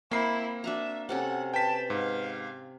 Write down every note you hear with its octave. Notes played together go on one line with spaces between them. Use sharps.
A#3 C4 E4 C7
D4 F#4 E5 A#5
C3 C#4 A4 F#5
B4 G5 A5 B6
G#2 F5